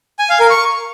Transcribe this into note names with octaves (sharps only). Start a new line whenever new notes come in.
G#5
F5
A#4
C#6